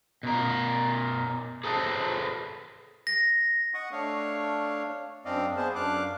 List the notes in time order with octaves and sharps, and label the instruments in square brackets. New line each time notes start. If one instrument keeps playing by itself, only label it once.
[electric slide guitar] B2 A#4
G#4 A4 B4 C5 A5
[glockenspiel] A#6
[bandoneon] D#5 F#5 C#6 D#6
A3 D4 C#5 F5
F#2 C4 D4 D5 D#5 F5
B3 G#4 C5 A5
F#2 D4 F5 D6 F#6